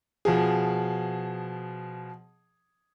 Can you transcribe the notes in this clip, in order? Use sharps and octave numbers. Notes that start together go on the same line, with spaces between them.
B2 F3 G#4